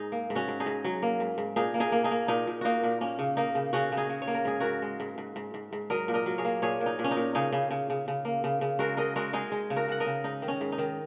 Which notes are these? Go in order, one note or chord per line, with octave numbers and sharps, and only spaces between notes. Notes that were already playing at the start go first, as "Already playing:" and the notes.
Already playing: G#2 D#4 G#4
A#3
G#2
C#4 F#4
G#2
D#4 G#4
G#2
F#3
A#3
G#2
G#2
A#2 D#4 G#4
A#3
D#4 G#4
A#3
D#4 G#4
A#3
A#2 D#4
A#2
A#3 D#4 F#4
A#2
A#3 C#4
C#3
A#3 D#4
C#3
C#3 C#4 F#4
C#3
D#4 G#4
C#3
C#5
A#3
A#4
G#2 G#4
G#2 F#4 A#4
G#3
G#2
G#2
G#2
G#2
G#2
F#3 A#4 D#5
A#2
A#4 D#5
F#3
G#4 C#5
A#3
A#2 G#4 C#5
A#2
D#4
A#2
C#4
D#4
A#2
C#3 D#4 G#4
C#3
C#3
C#3
C#3
A#3
C#3
C#3
G#3 F#4 A#4
G#3 A#4 D#5
G#3 F#4 A#4
G#3 D#4 G#4
G#3
C#3
F#4 A#4
C#3 F#5
A#4 D#5
C#3
G#2 D#4
D#3
C#4
G#2
D#4
D#3